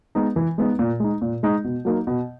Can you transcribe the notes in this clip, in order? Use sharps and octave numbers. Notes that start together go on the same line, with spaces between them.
G#3 B3 D#4
E3
G#3 B3 D#4
A#2
G#3 D#4
A#2
G#3 D#4
B2
F#3 A#3 D#4
B2